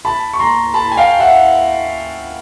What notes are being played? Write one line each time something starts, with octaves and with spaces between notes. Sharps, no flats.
A5 B5
C#6
A#5 C6
A5 B5
G#5
F5 G5
E5 F#5